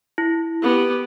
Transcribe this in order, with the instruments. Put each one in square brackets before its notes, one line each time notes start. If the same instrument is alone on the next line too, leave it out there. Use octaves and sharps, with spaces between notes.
[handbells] E4
[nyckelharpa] B3 G4